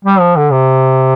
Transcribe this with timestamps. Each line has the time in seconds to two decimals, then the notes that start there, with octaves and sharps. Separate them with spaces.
0.05 G3
0.20 F3
0.36 D3
0.52 C3